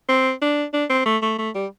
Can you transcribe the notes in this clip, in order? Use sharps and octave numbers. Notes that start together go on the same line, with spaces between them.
C4
D4
D4
C4
A3
A3
A3
G3